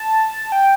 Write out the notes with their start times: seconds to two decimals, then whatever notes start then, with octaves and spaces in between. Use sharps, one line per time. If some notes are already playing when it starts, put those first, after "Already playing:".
Already playing: A5
0.52 G5